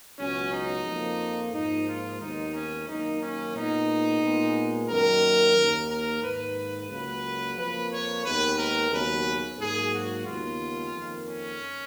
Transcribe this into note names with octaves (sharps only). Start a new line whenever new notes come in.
C#2 B2 F#3 C#4
D#4
F2 F3 A#3
G#2 F3 A#3 D#4
F4
D#2 D#3 G#3 B3 D#4
C#4
F#2 D#3 A#3 D#4
C#4
A#2 G#3 B3 D#4
A#2 G#3 B3
F#2 D#3 A#3 A#4
D#2 D#3 A#3
A#4
G#2 D#3 A#3 B4
C#2 C#3 F#3 A#3 B4
F2 F3 A#3 B4
C#5
D#2 D#3 G#3 B3 B4
A#4
D#2 C#3 F#3 B3 B4
G#2 F#3 A#3 G#4
F#4
D#2 C#3 G#3 B3 F4
F2 D#3 A#3
C#4